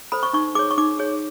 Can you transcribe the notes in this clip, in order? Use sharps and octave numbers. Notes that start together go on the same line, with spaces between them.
A4 C5 B5
C#6
D#4 C#6
G#4 C#5 D6
C#6
D#4 D6
G#4 C#5